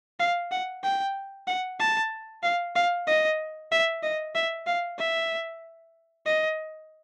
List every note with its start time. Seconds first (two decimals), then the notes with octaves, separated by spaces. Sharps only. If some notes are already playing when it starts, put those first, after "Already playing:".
0.19 F5
0.51 F#5
0.83 G5
1.47 F#5
1.80 A5
2.43 F5
2.75 F5
3.07 D#5
3.72 E5
4.03 D#5
4.35 E5
4.67 F5
4.99 E5
6.26 D#5